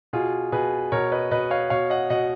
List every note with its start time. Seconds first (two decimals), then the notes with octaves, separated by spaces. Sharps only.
0.13 B2 F4 G#4
0.52 B2 G#4 B4
0.92 B2 A#4 C#5
1.12 B4 D#5
1.31 B2 B4 D#5
1.50 C#5 F5
1.70 B2 C#5 F5
1.90 D#5 F#5
2.10 B2 D#5 F#5